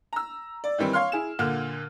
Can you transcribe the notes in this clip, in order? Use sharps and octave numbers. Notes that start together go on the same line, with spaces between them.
A#5 E6
D5
D#3 E3 G3 C4
C#5 F5 C6 F6
E4 G#4 E7
A#2 D3 A#3 F6